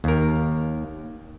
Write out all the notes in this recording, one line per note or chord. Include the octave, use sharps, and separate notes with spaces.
D#2 A#4